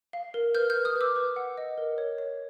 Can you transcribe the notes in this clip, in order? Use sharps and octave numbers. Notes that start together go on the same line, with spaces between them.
F5
A#4
B4 F6 G6
F6 G6
B4
D#6 F6
B4 D6 E6
B4
F#5
D#5
A#4
C#5
C#5